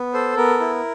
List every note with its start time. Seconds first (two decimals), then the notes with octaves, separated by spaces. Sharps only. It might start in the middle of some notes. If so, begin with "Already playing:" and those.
Already playing: B3
0.13 A4 C5
0.37 B3 A#4
0.60 E4